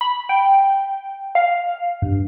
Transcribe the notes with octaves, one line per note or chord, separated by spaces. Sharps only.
B5
G5
F5
G2